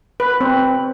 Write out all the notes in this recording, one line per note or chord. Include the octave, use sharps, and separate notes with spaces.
B4
C4